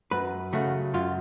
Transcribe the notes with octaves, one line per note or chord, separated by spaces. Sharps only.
F#2 B4
C#3 F#3 A3 F#4
F#2 F4